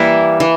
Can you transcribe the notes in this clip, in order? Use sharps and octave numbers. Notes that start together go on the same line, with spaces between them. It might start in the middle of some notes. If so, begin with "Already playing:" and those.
Already playing: E3 G3 A#3 E4
E3